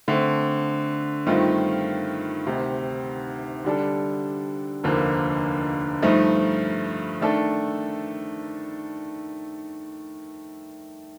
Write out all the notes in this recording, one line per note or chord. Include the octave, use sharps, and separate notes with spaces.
D3 A3 C4
G2 D#3 A3 C4 F4
D2 C3 D#3
D3 G3 D4 A4
F1 D#2 D3 F3 A#3
G2 F3 A3 D#4
D#3 A3 D4 A4